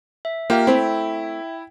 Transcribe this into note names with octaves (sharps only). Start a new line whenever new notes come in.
E5
A#3 F4 G4 E5 G5
A3 C4 E4